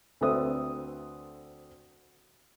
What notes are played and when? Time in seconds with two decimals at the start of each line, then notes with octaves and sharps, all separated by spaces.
0.21 D2 C4 A4 B4 E5 D#6